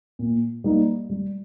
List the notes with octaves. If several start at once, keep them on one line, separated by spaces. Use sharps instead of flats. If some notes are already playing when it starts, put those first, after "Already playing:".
A#2
G3 A#3 D#4
G3